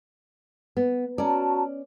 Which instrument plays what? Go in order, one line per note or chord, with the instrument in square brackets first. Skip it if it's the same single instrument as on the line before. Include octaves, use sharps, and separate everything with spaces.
[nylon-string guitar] B3
[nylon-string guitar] C#4 D5 [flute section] F#4 A5 A#5